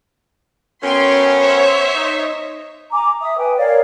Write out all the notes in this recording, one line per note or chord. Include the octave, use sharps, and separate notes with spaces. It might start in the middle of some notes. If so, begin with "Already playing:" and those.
F#2 B3 C#4 G5 C6
C5 C#5 E5
D#4
G#5 A#5 D6
E5 D#6
B4 G5 G#5
A#4 C#5 D5 F5